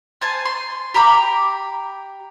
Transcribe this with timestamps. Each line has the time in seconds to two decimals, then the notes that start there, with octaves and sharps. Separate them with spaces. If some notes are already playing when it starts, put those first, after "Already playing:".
0.21 C5 G#5 A5
0.45 C6
0.94 G4 A#5 B5 D6